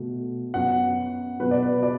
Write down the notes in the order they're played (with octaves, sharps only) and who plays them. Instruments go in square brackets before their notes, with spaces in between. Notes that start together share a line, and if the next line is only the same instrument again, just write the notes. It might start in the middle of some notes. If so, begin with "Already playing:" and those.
Already playing: [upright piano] B2 A3
F#2 F#3 B3 F#5
B2 F#3 B3 B4
D5
B4
D5